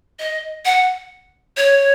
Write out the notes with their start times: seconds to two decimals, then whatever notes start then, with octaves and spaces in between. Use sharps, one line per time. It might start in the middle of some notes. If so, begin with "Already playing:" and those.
0.19 D#5
0.65 F#5
1.57 C#5